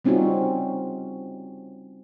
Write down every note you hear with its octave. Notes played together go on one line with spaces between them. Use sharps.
G3 C4 C#4 D#4 F4 F#4